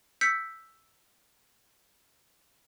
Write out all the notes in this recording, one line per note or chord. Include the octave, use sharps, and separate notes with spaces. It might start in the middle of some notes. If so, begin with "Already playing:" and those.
E6 G6 B6 C#7